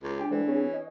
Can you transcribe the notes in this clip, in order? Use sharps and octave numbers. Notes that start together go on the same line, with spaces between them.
C#2
D4 G4 G#5
D3 E3 G#3 A4 C5
C4 C#4 G#4
D#5